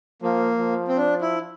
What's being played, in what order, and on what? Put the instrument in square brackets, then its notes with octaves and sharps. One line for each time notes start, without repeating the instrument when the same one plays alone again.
[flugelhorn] F3 [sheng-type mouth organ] A#3
[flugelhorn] F3
[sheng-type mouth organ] C4
D4
E4